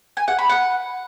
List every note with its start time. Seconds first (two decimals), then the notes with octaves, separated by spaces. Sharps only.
0.17 G#5
0.28 F#5
0.39 B5
0.49 F#5